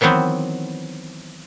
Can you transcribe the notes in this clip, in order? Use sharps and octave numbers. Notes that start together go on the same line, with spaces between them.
D#3 E3 F#3 B3 C4